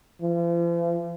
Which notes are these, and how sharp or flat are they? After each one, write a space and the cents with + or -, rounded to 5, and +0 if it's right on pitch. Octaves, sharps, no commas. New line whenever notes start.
F3 -45